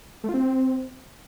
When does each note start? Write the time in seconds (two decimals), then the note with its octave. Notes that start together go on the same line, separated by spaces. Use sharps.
0.24 A3
0.29 F4
0.34 C4